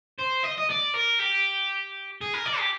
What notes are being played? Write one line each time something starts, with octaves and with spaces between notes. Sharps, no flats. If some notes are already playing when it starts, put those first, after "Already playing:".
C5
D#5
D#5
D5
A#4
G4
G#4
A#4
D5
G4